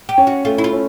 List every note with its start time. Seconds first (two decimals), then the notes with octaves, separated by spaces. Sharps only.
0.09 G4
0.18 C#4
0.27 F#4
0.45 A3 F4
0.58 E4
0.64 F4
0.72 C#4